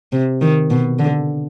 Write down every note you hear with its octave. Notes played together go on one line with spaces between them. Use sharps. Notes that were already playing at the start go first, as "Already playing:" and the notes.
C3
D#3
B2
D3